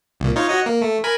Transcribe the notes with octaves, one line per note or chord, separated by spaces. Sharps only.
C2 A#2
D#4 F4 C#5
F#4 C#5 D#5
A#3
A3
A#4 G#5 B5